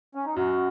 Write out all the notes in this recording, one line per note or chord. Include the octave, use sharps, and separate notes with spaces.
C#4
D#4
F#2 F#4